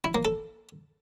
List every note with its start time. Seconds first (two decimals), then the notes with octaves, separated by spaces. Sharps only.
0.04 E4
0.15 A#3
0.25 A4